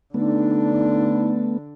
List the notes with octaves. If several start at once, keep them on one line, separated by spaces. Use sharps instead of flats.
D3 A3 B3 D4 D#4